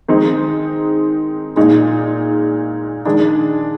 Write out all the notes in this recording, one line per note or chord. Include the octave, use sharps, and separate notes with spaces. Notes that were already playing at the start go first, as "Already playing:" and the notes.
D#3 G#3 C4 D#4
A#2 G#3 D#4
D#3 G#3 D4